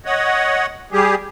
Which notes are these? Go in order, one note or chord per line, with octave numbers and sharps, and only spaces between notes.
C#5 D#5 F#5
G3 G4 G#4